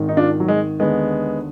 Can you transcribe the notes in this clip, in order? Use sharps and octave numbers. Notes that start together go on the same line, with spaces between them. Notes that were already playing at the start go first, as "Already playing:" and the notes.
Already playing: G#1 G#2 D#3
D#4
D4 F4
F#3
G#3
D#2 D3 G#3 B3